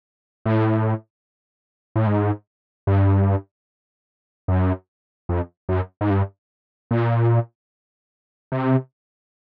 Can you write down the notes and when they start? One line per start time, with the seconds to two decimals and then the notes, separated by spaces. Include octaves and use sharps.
0.46 A2
1.96 A2
2.07 G#2
2.87 G2
4.48 F#2
5.29 F2
5.69 F#2
6.01 G#2
6.10 G2
6.91 A#2
8.52 C3